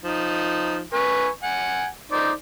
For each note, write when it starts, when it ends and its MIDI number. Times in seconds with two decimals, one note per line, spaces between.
0.03 0.81 53
0.03 0.81 63
0.93 1.28 71
0.93 1.28 80
0.93 1.28 85
1.43 1.87 78
1.43 1.87 80
2.12 2.31 63
2.12 2.31 72
2.12 2.31 74